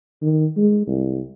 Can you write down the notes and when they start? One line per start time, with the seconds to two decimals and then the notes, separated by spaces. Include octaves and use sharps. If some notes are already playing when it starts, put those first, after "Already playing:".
0.22 D#3
0.57 G#3
0.87 C2